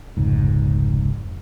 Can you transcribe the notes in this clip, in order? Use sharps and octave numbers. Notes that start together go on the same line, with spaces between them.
F1 C#2 G#2